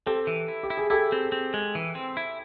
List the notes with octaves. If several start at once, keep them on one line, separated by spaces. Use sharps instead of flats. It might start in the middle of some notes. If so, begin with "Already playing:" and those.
C4 G4 A4
E3
E4
G4
E4
G#4
E4 G4 A4
C4
C4
G#3
E3
C4
E4